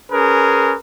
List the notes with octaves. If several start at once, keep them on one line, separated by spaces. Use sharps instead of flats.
C#4 G#4 A#4 B4